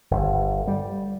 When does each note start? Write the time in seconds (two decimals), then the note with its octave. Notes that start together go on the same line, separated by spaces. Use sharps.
0.11 G1
0.67 G3